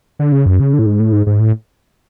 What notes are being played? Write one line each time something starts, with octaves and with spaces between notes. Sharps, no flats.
D3
C#3
F#2
C#3
D3
A2
G#2
A2
G#2
G#2
A2